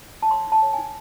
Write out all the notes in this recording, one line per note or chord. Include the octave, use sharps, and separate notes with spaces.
A5
C#5 C6
D#4 A5
C#5
G#5
D#4